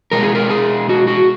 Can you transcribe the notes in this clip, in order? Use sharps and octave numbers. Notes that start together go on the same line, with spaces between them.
B2 G#3 A#4
G#4
A#4
G#4
F#4
F#4